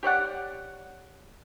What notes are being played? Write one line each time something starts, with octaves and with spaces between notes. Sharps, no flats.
G4 C#5 D5 F#5